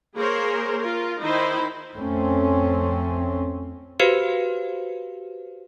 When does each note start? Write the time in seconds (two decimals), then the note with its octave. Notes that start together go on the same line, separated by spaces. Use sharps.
0.17 A#3 G#4 A#4 C5 C#5
0.79 F4 A#4
1.21 D#3 D#4 E4 C5 B5
1.96 F2 A3 C4 C#4
4.00 F#4 G4 B4 C5 F5